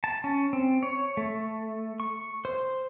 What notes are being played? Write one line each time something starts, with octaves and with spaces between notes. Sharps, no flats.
A5
C#4
C4
C#5
A3
C#6
C5